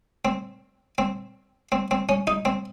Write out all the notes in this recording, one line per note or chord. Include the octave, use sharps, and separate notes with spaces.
C4
C4
C4
C4
C#4
D#4
C4